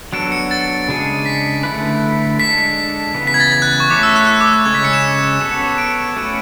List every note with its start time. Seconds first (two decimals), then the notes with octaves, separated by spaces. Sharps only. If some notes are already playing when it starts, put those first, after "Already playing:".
0.13 F#3 B3 D4 F#4 A4 D7
0.32 C#7
0.51 A6
0.88 C#3 G#3 D4 G#4
1.26 B6
1.63 D3 A3 E4 B4
2.40 G#3 D4 A4 B6
3.15 C#3 E3 B3
3.27 B6
3.34 G#6
3.40 A6
3.52 G#6
3.62 F#6
3.80 C#6
3.90 A3 E4 A4 C#5 D6
4.03 E6
4.16 F#6
4.27 F#6
4.41 D6
4.53 F#6
4.66 C#3 G#3 C#4 G#6
4.75 B6
4.84 C#7
4.93 E7
5.41 B3 F#4 A4 C#5
5.78 D7
6.16 A3 C#4 F#4 B4